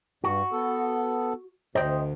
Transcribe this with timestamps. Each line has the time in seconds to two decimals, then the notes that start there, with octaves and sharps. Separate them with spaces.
0.24 G2 F#4
0.52 B3 A4
1.75 D2 C5 D#5 G5